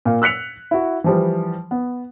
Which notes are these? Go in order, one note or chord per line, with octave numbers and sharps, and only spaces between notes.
A#2 F5
E6 F#6 B6 C#7 F7
E4 F#4
E3 F3 G3
B3